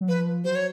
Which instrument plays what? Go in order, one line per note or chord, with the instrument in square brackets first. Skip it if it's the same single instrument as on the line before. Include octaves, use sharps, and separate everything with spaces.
[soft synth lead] F#3
[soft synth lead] F3 [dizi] B4
[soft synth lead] F#3 [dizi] C5
[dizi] C#5